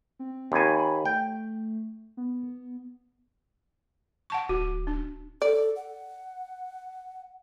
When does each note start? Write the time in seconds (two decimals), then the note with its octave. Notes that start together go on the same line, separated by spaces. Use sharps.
0.19 C4
0.52 D#2 G#5 B5
1.05 A3 G5
2.17 B3
4.30 F#5 A5 C#6
4.49 D1 F#4
4.87 D4
5.42 A4 D5
5.76 F#5